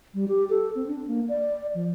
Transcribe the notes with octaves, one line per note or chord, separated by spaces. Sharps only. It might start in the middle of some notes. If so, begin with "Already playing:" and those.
G3
G4
A4
C4
D4
A#3
D5
F3